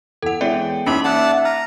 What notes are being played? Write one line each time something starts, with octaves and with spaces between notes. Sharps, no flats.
E2 A4 F#5
E3 G#3 B3 C#5 D5 E5 G5
E2 A#3 C#4 D#4 E5 B5
D5 E5 F#5 A5 F#6
A#5 F6